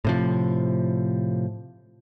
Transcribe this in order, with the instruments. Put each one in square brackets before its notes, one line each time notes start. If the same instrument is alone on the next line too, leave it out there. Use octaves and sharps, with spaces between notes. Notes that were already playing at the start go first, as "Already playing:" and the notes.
[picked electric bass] A2 C3 F3